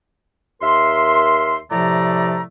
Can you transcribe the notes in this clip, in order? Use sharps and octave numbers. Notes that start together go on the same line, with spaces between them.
D#2 A#4 E5 C6
A2 C3 F3 A3 D5 A#5